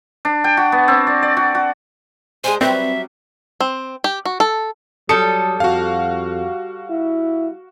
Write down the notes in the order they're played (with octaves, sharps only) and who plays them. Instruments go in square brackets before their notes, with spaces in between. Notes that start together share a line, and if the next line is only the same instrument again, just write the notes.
[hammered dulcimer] D4
G5
F#4
B3
C4
D5
D5
F#4
F#4
[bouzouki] G#3 D4 C5 [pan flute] G#5
[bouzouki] F#3 G3 [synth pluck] C4 [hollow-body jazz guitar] B4 C5 D5 [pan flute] E5
[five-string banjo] C4
G4
F#4
A4
[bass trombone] F#3 [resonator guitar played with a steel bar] G3 A4 [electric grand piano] D#6 C#7
[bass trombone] F2 [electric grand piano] F#4 F5
[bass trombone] E4